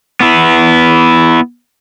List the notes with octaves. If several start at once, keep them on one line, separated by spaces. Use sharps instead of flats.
B3 E4